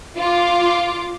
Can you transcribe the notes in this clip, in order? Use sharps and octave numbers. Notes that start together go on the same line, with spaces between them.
F4 D6